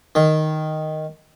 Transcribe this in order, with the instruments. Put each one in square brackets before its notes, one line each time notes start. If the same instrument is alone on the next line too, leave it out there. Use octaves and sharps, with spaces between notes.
[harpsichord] D#3